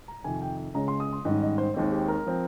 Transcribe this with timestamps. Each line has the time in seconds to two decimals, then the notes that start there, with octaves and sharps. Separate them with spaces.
0.08 A#5
0.24 F2 C3 D#3 G#5
0.42 G5
0.74 C#2 C#3 G#3 C#4 A#5
0.88 C6
1.00 D#6
1.13 C6
1.25 G#2 D#3 G3 C#4 D#5
1.42 D#5
1.58 C5
1.74 D#2 D#3 G#3 C4
1.92 G4
2.08 A#4
2.26 F3 C4